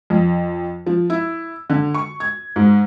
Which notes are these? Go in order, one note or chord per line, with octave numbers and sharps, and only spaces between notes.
F2
F3
E4
D3
C#6
G#6
G#2